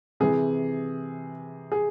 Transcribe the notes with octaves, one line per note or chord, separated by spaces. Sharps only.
C3 E3 G#4
G#4